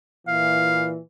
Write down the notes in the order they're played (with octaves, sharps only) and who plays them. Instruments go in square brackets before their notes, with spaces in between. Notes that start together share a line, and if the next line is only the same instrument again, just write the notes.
[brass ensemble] A#2 E3 [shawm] F5